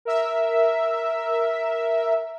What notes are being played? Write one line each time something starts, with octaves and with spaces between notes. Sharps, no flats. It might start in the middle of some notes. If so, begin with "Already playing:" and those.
A#4 E5